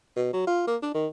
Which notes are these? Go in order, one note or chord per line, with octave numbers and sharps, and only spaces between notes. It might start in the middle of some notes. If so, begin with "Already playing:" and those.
B2
F#3
F4
A#3
D4
D#3